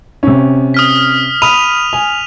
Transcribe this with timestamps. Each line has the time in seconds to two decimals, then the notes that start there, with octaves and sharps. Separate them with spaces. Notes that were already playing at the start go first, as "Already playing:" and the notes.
0.23 C3 C#4
0.74 D#6 F6 B6
1.42 B5 D#6 F6 D#7 F7
1.93 G#5